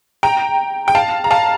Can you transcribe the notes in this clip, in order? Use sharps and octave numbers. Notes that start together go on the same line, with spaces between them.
G5 A#5
G5
F5 A5
A#5
F5 A5